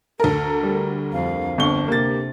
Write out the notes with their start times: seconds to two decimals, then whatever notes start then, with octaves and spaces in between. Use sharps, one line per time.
0.20 D2 A4 A#4
0.63 G3
1.13 F2 F5
1.58 G1 C4 D4 C#6 G7
1.88 C3 A#3 G4 A6